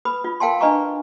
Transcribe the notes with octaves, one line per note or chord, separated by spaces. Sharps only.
B4 B5 D#6
F4
A#4 F5 G5 A5 C6
D4 B4 D#5 G#5 A#5 C#6